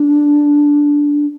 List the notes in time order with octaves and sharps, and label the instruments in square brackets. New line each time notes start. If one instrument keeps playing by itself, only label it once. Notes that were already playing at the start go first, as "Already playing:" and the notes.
Already playing: [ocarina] D4